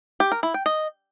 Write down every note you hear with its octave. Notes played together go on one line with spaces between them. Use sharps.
G4
A#4
E4
G5
D#5